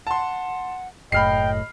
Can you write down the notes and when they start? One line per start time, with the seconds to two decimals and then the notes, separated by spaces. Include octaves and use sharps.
0.07 F#5 A5 C6
1.12 F#1 A2 D#5 G5 B5 F6 C7